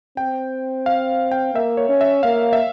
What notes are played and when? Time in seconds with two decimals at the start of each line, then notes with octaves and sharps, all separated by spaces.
0.17 C4 G5
0.86 F5
1.31 G5
1.54 A#3 E5
1.77 C#5
1.89 C#4
2.01 E5
2.23 A#3 F5
2.53 E5